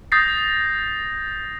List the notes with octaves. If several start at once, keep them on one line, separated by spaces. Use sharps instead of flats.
D#6 G6 A6 A#6 C7